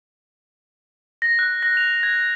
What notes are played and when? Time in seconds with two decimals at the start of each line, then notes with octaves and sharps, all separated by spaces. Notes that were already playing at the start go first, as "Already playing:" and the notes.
1.22 A#6
1.39 F#6
1.63 A#6
1.77 F7
2.03 G#6